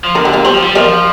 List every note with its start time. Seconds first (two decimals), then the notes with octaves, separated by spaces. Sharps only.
0.04 F3
0.15 D3 A#4
0.25 G4
0.33 F4 A#4
0.45 G3 G4 C5
0.54 F3
0.62 G3
0.75 F3 A#4 D5